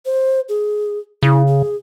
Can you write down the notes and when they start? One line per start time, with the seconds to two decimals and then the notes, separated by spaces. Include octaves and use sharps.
0.05 C5
0.49 G#4
1.23 C#3 E4
1.47 G#4